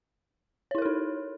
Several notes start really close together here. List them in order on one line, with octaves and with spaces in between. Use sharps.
C#5 E4 A#4 A4 D#4